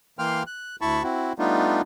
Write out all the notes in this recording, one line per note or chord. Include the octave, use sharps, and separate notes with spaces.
E3 A#3 F5 G5 C6 F6
F#6
D2 E4 A5 B5 C#6
C4 E4 F#4
G3 A3 B3 D4 D#4 F4